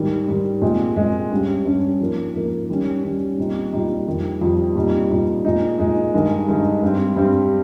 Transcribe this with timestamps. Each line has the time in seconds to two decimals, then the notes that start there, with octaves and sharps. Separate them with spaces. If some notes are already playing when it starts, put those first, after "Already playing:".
Already playing: G#2 D#3 G3
0.28 G#2 D#3 G3
0.62 A#2 G#3 C4
0.97 A#2 G#3 C4
1.31 G2 G3 C#4
1.65 G2 G3 C#4
2.00 G#2 F3 A#3
2.34 G#2 F3 A#3
2.69 D#3 G3 C#4
3.03 D#3 G3 C#4
3.38 A#2 G3 C4 D#4
3.73 A#2 G3 C4 D#4
4.07 F2 D#3 G3
4.41 F2 D#3 G3
4.75 A#2 G3 C4 D#4
5.10 A#2 G3 C4 D#4
5.45 A#2 G#3 D#4
5.79 A#2 G#3 D#4
6.14 G2 D#3 G#3 D#4
6.48 G2 D#3 G#3 D#4
6.82 G2 G3 C4
7.16 G2 G3 C4